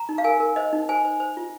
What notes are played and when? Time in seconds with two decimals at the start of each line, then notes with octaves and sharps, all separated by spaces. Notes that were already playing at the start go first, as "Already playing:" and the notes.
Already playing: A#5
0.09 D#4
0.18 F5
0.24 A#4 G#5
0.40 A#4
0.56 C5 D#5
0.73 D#4
0.89 C5 G#5
1.05 C5
1.20 C5
1.37 F4